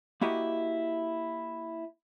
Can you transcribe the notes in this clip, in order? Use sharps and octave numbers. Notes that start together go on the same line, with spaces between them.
A#3 E4 F#4 G4 D#5